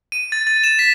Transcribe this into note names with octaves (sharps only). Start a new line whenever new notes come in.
D#7
A6
A6
E7
B6